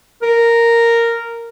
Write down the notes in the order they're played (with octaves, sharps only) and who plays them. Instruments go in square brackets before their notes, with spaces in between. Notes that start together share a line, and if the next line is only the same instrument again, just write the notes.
[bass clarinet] A#4